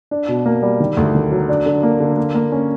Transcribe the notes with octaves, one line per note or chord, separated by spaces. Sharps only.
D4
B2
A#3
G3
D#3
D2
D#3
F#3
D4
D3
A#3
D3
A#3
A#3
C#4